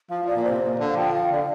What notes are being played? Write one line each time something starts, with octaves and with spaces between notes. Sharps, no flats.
F3 F5
F3 D5
A#2
C3 C5
A#2 D5
D3 F5
F3 G5
F3 F5
D3 D5